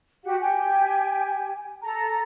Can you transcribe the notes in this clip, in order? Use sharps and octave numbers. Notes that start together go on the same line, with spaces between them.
F#4 G4 F#5
G4 G5 G#5
A4 A#5